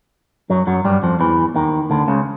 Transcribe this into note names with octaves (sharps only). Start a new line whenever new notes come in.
F#2 F#3
F#2 F#3
G2 G3
F2 F3
E2 E3
D#2 D#3
D2 D3
C#2 C#3